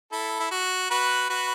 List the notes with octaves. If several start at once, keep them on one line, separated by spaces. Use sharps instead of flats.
E4 A4
E4
F#4
F#4 B4
F#4 B4